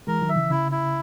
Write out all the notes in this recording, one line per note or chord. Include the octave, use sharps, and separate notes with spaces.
E3 G#3 A#4
D#3 F#3
E5
C#3 E3
C#3 E4
E4